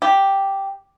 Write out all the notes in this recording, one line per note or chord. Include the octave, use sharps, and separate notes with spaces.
G4